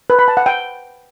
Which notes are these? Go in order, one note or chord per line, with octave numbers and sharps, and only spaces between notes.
B4
B5
A5
F#5
G5